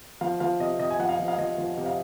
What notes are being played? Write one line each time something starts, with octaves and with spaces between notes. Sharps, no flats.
F3 F5
F3 F5
C3 D#5
C3 D#5
G#5
F3 F#5
F5
F3
F5
F3 D#5
F3
C3
F5